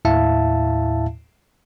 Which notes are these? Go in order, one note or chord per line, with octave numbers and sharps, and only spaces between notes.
D#2 A2 E4 E5 F5 A5